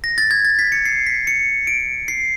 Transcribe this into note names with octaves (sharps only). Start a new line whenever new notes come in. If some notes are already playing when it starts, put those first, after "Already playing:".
A#6
A6
G#6
A6
B6
C#7
C7
B6
C#7
D7
C7